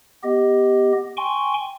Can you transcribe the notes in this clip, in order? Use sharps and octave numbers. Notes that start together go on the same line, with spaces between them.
B3 G4 D#5
G5 G#5 C6 C#6